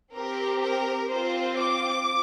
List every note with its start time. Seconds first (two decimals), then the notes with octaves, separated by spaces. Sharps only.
0.15 C4 G4 A#4
0.64 A#4
1.12 C4 F4 C5
1.61 D6